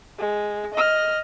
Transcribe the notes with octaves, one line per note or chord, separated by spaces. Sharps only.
G#3
D#5 F6